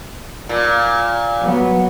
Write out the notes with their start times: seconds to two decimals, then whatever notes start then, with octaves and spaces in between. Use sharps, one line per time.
0.49 A#2
1.41 F#3 B3